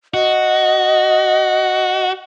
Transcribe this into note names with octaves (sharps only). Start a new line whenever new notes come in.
F#4 D#5